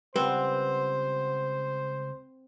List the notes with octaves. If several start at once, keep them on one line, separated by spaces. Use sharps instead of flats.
C#2 G3 C4 B4 C5 F#5